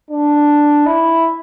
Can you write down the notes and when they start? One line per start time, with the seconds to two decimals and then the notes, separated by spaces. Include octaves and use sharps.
0.11 D4
0.86 E4